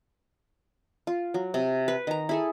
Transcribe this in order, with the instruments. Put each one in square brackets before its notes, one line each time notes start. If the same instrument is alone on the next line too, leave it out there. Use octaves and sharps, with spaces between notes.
[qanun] F4
F#3
C3
B4
D#3 A#5
E4 G#4 A4